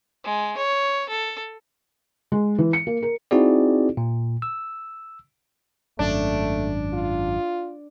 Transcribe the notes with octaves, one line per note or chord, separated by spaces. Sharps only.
G#3
C#5
A4
G#3
E3
C#7
A#3
A#4
C4 D#4 E4 F#4 G#4 D5
A#2
E6
G#1 F#2 A3 D4
F4